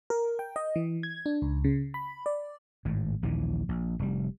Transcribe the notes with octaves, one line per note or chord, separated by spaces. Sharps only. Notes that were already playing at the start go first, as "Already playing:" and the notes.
A#4
G5
D#5
E3
G#6
D4
C#2
C#3
B5
D5
G#1 A2
A#1 D#2 A#2 E3
A#1
F1 G3